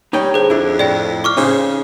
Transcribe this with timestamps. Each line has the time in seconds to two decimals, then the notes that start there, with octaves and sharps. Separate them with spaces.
0.13 G3 D#4 C#5 G5
0.34 D3 G#4 C5
0.50 F2 D4 E4
0.79 A2 D5 G5 A#6
1.24 C#6 D6 F6
1.37 C#3 D#4 C5